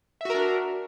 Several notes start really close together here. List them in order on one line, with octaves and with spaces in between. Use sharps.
E5 F#4 A#4 D4